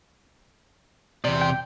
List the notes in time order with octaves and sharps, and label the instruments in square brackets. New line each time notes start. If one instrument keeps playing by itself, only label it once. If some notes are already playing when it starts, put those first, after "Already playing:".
[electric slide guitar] E2 D5 [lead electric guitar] C3
[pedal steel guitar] G5